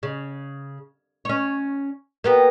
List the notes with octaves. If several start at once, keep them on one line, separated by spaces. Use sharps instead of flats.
C#3
C#4 C#5
A#3 B3 G4